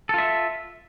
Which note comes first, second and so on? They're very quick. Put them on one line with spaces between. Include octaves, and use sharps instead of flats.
A4 F4 E5